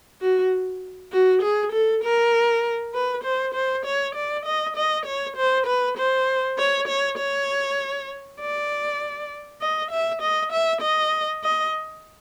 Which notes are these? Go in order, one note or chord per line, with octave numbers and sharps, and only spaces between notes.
F#4
F#4
G#4
A4
A#4
B4
C5
C5
C#5
D5
D#5
D#5
C#5
C5
B4
C5
C#5
C#5
C#5
D5
D#5
E5
D#5
E5
D#5
D#5